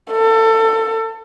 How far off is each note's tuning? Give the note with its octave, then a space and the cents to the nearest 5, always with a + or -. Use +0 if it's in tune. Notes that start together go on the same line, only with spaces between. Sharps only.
A4 +25